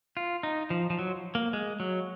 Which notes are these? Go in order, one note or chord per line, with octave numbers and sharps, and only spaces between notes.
F4
D#4
F3
F3
F#3
A#3
G#3
F#3